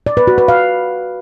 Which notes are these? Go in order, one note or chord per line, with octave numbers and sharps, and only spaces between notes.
D5
B4
F#4
B4
F5